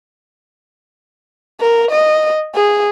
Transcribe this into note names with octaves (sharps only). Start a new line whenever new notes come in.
A#4
D#5
G#4